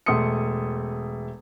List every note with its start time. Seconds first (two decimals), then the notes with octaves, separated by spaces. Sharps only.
0.06 E1 A3 C6 D#6 C#7